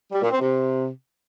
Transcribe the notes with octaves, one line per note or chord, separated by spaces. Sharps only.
G3
A#2
C4
C3